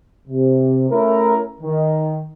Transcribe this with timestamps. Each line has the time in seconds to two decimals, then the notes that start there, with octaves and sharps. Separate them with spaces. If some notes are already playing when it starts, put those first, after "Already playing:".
0.28 C3
0.90 A3 C#4 E4 A#4
1.61 D#3